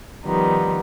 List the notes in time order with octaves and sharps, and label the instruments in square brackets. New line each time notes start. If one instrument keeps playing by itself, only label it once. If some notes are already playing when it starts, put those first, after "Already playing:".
[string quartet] D#3 F3 G3 B3 D#4